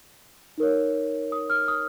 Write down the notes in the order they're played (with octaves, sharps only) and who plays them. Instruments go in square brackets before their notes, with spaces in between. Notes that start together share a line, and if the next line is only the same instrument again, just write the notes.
[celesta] D#4 A#4 C#5
D#6
F6
D#6